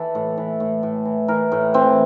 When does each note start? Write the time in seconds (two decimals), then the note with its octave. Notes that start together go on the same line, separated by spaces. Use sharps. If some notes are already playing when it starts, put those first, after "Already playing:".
Already playing: E3 A4
0.15 A2
0.37 E3
0.60 A2
0.83 A2
1.05 E3
1.28 E3 A#4
1.52 A2
1.74 E3 C4